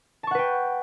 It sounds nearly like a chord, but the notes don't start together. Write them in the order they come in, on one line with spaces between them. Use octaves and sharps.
A5 C#6 F#5 B4 G5